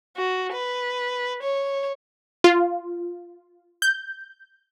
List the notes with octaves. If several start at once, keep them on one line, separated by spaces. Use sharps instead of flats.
F#4
B4
C#5
F4
G6